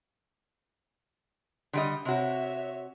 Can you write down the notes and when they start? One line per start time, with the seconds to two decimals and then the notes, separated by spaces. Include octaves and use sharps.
1.73 D3 G3 D#5
2.05 C3 F#4 C#5 E5